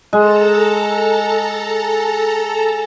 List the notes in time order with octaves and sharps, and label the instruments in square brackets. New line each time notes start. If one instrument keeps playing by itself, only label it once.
[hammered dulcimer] G#3 [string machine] A4 A5 A#5